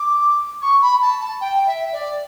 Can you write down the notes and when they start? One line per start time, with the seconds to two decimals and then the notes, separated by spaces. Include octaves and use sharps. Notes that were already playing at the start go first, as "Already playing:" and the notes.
Already playing: D6
0.62 C#6
0.82 B5
1.01 A5
1.21 A5
1.40 G5
1.66 E5
1.93 D5